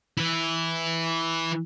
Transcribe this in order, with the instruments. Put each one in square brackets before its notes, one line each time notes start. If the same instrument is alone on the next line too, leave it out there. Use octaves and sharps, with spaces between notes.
[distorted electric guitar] E3 E4